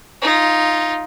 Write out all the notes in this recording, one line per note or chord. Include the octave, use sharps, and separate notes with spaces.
D#4 F4